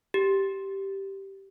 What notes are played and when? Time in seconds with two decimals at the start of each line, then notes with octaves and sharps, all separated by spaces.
0.14 G4